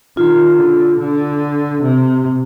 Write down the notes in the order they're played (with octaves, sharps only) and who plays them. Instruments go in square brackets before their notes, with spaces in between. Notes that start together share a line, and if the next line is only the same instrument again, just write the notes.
[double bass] D#3 [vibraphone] F4
[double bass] D3
D3
C3